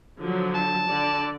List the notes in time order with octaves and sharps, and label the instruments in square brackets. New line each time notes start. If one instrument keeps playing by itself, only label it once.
[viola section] D3 F3 F#3
[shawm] A5
[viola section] D3 D5